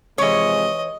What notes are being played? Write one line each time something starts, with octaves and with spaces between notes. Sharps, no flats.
C3 E3 F3 G#3 C#5 D#5